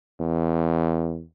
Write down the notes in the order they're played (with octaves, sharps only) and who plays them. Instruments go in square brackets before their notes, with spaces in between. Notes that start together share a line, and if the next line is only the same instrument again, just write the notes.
[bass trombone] E2